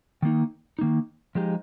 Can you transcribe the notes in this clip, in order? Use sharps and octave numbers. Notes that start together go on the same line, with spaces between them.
D#3 A#3 D#4
D#3 A#3 D#4
F3 G#3 D#4 G4